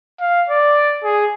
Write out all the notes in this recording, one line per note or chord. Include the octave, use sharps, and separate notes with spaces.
F5
D5
G#4